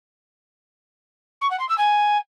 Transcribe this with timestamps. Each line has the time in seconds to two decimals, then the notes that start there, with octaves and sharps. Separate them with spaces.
1.41 C#6
1.50 F#5
1.59 C6
1.69 E6
1.78 G#5